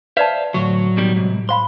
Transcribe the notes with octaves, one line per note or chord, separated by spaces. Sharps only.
B4 C5 D5 E5 F5 A5
D2 A2 F#3
B2 D#3 G3
C2 G#2
C5 F5 B5 C6